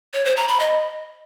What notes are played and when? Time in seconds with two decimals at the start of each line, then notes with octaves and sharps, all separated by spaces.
0.14 C#5
0.25 C5
0.37 A#5
0.48 B5
0.60 D#5